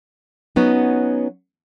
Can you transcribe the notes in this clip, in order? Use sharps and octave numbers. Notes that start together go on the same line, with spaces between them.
F#3 B3 C#4 D#4